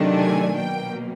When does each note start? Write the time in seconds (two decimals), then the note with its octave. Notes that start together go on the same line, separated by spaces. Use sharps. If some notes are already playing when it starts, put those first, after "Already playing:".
Already playing: C3 D#3 F#3 A3 D4
0.17 G#5
0.56 B2 F#3 A#3 G5